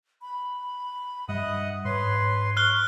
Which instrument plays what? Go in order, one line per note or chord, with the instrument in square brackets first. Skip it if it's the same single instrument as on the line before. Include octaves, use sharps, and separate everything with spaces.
[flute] B5
[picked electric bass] G2 G3 [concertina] D#5 F#5 D#6 [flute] E5
[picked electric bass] G#2 [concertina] B4 C6 [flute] C#5
[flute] C#5
[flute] C#6 [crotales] F6 F#6 G7